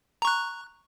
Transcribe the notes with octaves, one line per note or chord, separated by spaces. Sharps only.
A#5 C#6 F#6